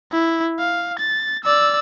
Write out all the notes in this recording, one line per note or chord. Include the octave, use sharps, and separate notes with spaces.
E4
F5
A6
D5 E6